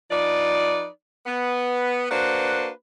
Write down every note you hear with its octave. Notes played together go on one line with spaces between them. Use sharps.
F3 D#4 B4 D5
B3
A#3 D4 F#4 B4 C5